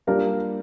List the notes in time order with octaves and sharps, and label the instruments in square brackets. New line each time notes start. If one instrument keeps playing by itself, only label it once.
[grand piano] G3 A#3 D4 F4 A#4